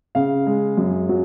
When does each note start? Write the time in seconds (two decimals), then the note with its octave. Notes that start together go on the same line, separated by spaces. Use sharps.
0.15 C#3 F5
0.46 G#3
0.77 F#2
1.09 F#3